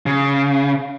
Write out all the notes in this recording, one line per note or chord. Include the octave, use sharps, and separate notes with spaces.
C#3